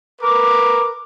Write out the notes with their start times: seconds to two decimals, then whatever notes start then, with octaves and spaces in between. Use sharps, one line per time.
0.21 A#4 B4 D6